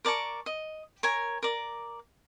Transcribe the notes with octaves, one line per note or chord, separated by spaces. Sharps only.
A#4 D5 A5 C#6
D#5
A#4 C#5 G#5
A#4 D5